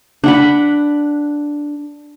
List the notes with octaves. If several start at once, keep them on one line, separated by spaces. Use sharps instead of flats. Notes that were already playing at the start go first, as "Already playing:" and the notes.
D4 F#5 B5